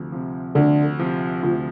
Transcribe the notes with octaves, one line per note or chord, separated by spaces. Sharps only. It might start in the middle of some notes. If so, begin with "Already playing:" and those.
Already playing: D2 C3 F3
C3 F3
D2 D3
C3 F3
D2 F3